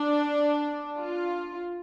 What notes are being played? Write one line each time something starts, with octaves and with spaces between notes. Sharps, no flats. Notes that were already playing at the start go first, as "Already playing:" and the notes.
Already playing: D4
F4